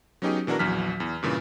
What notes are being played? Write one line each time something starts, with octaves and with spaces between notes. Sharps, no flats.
F#3 B3 C#4 D#4 G4 G#4
B2 E3 D4 F#4 A#4
A#1 E2 F#3 F6 B6
E2
G2 A#2 C#3 E3